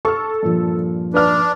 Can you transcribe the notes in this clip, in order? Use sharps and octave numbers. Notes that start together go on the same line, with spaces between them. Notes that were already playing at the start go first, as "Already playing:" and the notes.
A4 C#6 F6
G2 A#2 F3
D4 B4 F6